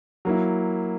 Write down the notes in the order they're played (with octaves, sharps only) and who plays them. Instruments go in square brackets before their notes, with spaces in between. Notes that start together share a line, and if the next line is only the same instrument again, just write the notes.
[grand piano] F#3 A#3 E4